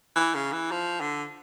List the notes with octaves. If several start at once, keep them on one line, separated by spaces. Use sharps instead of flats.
E3
C#3
E3
F3
D3